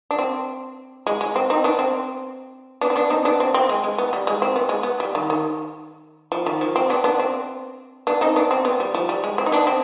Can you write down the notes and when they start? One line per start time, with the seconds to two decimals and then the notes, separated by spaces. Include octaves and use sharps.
0.11 D4
0.19 C4
1.07 G#3
1.21 G#3
1.36 C4
1.50 C4 D#4
1.64 B3 D4
1.79 C4
2.81 B3 D4
2.90 C4
2.96 B3 D4
3.10 C4 D#4
3.25 B3 D4
3.40 C4
3.54 C4
3.69 G#3
3.84 G#3
3.98 B3
4.13 G3
4.27 G#3
4.42 C4
4.56 B3
4.69 G#3
4.83 B3
5.00 G3
5.15 D#3
5.30 D#3
6.32 F3
6.46 D#3
6.61 F3
6.76 C4
6.90 B3 D4
7.04 B3 D4
7.19 C4
8.07 B3 D4
8.21 C4 D#4
8.36 B3 D4
8.51 C4
8.65 B3
8.80 G3
8.95 F3
9.09 G3
9.24 G#3
9.38 C4
9.46 D#4
9.52 B3 D4
9.67 C4